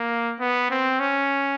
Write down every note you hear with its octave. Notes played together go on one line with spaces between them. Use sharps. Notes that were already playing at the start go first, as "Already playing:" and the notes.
Already playing: A#3
B3
C4
C#4